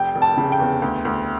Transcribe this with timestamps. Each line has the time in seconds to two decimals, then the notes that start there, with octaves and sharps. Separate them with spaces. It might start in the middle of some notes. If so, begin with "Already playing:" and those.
Already playing: F1 G5
0.15 F1
0.22 A5
0.37 C#3
0.52 G5
0.60 E2
0.82 D2
1.05 D2